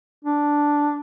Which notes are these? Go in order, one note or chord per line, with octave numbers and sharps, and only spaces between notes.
D4